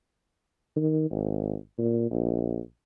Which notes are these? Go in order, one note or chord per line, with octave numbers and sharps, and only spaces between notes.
D#3
G#1
A#2
A#1